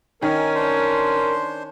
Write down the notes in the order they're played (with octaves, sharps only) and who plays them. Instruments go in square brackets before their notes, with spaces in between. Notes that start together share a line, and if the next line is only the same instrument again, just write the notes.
[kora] D#3 [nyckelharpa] C#4 [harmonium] A#4 [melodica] G#5
[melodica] D4 C5 C6